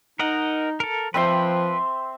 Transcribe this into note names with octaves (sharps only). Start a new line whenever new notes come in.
D#4 A#4 D#5 F#5
A4 A#4
F3 C4 B4 E5 G5 C6